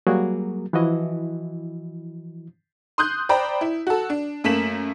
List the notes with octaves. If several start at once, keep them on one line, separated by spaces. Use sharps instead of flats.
F#3 G3 A#3 F#4 G#4 A#4
E3 F3 E4 F#4 D#5
C6 D#6 F#6 G6
C5 D5 G5 A#5 B5
E4
F#4 A4
D4
F#2 A3 A#3 B6 E7 F#7